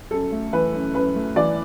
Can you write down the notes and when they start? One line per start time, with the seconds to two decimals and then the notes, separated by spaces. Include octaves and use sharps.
0.11 F#2 A4
0.32 A3
0.53 E3 B4
0.73 F#2
0.94 F#2 B4
1.15 A3
1.36 E3 D5